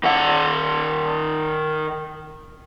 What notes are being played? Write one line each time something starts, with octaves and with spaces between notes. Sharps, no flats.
D#3 F#5